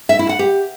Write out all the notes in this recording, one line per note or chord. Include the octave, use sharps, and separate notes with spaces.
E5
E4
F#5
G4